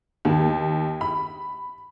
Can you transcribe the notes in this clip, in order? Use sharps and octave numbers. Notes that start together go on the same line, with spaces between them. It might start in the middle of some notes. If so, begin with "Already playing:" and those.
D#2
B5